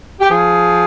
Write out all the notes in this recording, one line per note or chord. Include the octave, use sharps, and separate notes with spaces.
G4
F3 G#4